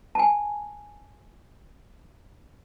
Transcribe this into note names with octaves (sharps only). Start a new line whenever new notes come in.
G#5 A5